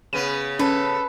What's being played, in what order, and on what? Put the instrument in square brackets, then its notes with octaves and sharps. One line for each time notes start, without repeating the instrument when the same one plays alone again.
[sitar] C#3 B3 [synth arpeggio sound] D#7
[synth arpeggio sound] C#4 [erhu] A4 [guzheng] B4